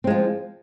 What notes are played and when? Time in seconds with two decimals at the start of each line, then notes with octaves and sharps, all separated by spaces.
0.04 C4
0.07 G#3
0.10 F3